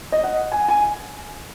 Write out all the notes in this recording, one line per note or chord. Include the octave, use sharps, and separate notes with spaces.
D#5
F#5
G#5
G#5